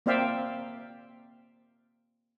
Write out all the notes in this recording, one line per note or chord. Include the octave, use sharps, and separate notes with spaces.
A#3 C4 D5 E5 F5 G5